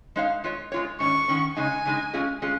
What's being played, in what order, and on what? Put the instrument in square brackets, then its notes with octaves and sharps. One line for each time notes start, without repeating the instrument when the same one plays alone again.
[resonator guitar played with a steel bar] G#3 D#4 C#5 F5
G#3 F4 C#5
G#3 F4 C#5
[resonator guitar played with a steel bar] G#2 D#3 C#4 [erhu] C#6
[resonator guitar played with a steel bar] G#2 D#3 C#4
[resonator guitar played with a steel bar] C#3 G#3 D#4 [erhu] G#5
[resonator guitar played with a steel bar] C#3 G#3 D#4
G#3 C#4 F4 G#4
G#3 C#4 F4 G#4